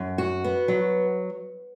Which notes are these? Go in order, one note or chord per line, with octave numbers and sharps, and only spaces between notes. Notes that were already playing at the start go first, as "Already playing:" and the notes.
Already playing: F#2
F#4
B3
F#3